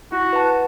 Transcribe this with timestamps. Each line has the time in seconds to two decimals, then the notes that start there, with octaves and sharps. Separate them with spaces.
0.12 E4 F#4
0.33 B4 F#5 A5